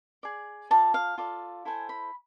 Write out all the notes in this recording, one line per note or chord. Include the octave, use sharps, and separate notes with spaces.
G#4 D5
F4 A4 D5 A5
F5
F4 A4 D5
E4 A4 C5 G#5
B5